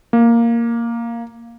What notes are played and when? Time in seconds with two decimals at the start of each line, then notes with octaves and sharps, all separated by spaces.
0.13 A#3